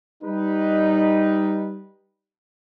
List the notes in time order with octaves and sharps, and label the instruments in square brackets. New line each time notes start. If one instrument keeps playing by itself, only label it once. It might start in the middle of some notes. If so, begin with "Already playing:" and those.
[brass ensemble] G3 D#4 B4